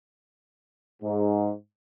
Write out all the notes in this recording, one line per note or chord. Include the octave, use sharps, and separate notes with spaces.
G#2